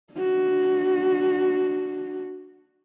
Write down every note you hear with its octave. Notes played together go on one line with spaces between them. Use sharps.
D4 F#4